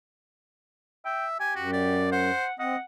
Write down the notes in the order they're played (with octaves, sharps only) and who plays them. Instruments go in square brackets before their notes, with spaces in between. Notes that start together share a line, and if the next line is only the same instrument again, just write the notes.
[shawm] E5 [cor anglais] G5
[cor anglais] G4 [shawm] G#5
[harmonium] F#2 [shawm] F#4
[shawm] D5
[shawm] C5 [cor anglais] F#5
[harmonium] C4 [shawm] D#5 [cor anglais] F#5